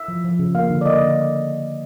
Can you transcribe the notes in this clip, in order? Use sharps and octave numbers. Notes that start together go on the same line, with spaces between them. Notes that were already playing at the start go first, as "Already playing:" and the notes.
Already playing: E5
F3
F3
C#3
A#3 F5
D3
D5
A#3 D#5
D3